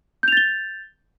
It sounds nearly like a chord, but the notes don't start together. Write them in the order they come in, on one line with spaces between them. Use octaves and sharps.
G6 F7 A6 G7